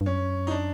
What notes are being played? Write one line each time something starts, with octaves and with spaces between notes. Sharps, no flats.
G2
F#2 C#4
D#4
D4